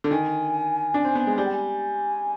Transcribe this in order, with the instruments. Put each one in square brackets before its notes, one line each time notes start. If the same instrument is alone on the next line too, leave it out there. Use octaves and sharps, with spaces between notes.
[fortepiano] D3
[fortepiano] D#3 [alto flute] G#5
[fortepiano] D4
C4
B3
G#3
[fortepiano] G3 [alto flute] G#5
[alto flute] G5
G#5